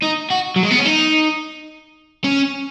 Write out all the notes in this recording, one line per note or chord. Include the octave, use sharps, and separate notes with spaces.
D#4
F#4
F#3
G#3
B3
C#4
D#4
C#4